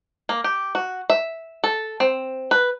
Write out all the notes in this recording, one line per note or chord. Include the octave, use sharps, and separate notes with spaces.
A#3
G4
F#4
E5
A4
C4
B4